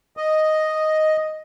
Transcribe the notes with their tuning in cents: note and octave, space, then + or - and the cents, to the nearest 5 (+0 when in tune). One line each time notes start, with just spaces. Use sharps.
D#5 +0